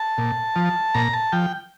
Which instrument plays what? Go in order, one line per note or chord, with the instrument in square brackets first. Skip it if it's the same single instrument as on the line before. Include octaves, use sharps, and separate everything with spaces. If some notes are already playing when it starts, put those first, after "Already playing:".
Already playing: [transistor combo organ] A5
A#2
F3
A#2 A#5
A5
F3 G5